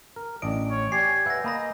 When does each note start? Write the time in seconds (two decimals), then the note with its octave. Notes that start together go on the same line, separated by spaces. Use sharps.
0.16 A#4
0.42 A1 D4 D#5 D7
0.70 C#5
0.92 G4 C#5 D5 G#5 C7
1.26 B4 E5 F#5 G6 A#6
1.44 A#3 D#5 G#5 B5 A#6